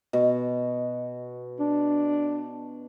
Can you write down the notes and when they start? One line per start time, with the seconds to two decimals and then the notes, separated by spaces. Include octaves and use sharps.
0.13 B2
1.60 D4